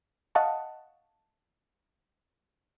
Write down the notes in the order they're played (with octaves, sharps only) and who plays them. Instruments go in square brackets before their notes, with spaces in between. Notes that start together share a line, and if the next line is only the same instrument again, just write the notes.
[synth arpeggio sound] D#5 F5 F#5 A5 C#6